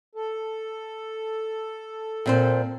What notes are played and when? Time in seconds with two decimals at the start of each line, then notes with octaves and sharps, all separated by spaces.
0.15 A4
2.26 A#2 C4 C5